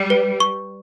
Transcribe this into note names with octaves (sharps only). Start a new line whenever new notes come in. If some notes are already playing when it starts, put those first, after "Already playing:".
Already playing: G3
B4
C#6